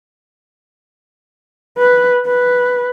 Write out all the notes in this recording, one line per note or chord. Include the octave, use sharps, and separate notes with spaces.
B4
B4